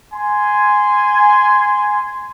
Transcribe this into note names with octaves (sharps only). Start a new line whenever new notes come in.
G#5 C6